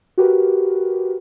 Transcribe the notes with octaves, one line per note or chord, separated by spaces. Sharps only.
F#4 G4 A#4 B4